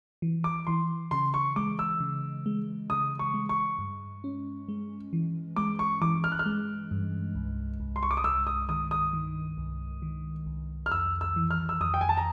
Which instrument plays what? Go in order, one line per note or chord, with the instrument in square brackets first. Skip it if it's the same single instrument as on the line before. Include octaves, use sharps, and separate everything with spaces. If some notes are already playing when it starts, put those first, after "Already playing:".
[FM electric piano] E3
[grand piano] D6
[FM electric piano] E3 [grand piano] C6
[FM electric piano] C#3 [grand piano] C6
[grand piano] C#6
[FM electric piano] G#3 [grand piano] D6
[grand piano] E6
[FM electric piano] C#3
G#3
[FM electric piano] C#3 [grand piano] D#6
[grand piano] C#6
[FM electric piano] G#3
[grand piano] C#6
[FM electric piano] G2
C#4
G#3
E3
[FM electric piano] G#3 [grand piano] D6
[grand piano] C#6
[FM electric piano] E3 [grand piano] D6
[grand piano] F6
F#6
F6
[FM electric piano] G#3
G2
C2
C2
[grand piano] C6
C#6
D6
D#6
[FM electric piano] C2 [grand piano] E6
[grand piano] D#6
[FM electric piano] D#3 [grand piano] D#6
[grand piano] D#6
[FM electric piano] D#3
C2
D#3
C2
[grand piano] F6
[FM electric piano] F2 [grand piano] E6
[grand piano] E6
[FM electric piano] E3
[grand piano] F6
E6
[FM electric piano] F2 [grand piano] D#6
[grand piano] G5
G#5
A5
A#5